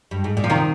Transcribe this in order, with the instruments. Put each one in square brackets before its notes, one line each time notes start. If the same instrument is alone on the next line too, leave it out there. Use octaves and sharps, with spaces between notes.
[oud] G2
G#2
A#2
[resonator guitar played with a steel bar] F3
[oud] C3 [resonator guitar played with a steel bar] D#3